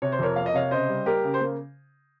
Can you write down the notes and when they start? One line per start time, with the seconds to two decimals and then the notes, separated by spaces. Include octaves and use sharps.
0.02 C3 C#5
0.12 C5
0.19 F2 A#4 C#5
0.36 A#3 F5
0.46 D#5
0.54 C3 C#5 F5
0.71 C#3 C5 D#5
0.89 G3
1.06 A#3 G4 A#4
1.23 C#3
1.34 C5
1.41 A#3